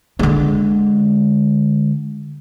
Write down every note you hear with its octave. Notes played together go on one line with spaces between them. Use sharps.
D3 G#3